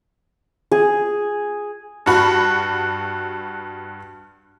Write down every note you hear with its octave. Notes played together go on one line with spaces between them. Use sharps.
G#4
G2 F#4 B5